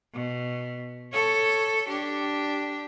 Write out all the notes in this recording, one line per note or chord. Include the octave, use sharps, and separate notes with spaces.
B2
A4 C#5
D4 G4